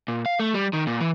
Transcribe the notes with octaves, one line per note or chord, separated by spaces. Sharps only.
A#2
F5
A3
G3
D#3
A#2
E3